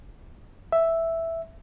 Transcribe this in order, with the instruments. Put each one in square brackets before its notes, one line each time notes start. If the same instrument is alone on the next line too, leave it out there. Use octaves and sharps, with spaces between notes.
[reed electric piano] E5